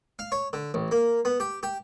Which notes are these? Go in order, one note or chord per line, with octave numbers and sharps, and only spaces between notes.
F5
C#5
D3
A1
A#3
B3
G4
G4